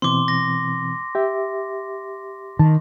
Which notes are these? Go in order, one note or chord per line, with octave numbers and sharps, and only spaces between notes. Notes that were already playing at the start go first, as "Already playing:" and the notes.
B2 E3 C4 C6 D6
A#6
G4 E5
D#3 A5